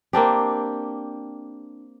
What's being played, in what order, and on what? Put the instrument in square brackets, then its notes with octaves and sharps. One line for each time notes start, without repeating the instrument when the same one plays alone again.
[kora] A#3 C4 D4 G4